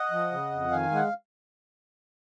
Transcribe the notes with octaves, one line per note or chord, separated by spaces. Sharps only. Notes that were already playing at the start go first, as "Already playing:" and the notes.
Already playing: D#5 F#5
F3
C#3
F2
D#3 F5 G#5
G#3 F#5